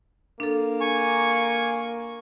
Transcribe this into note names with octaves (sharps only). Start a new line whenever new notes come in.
A#3 D4 A4
G#5 C#6